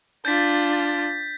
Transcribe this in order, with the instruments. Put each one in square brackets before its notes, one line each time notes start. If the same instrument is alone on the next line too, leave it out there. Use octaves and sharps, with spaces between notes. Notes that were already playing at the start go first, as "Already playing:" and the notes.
[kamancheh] D4 F4 [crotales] G6 A6 B6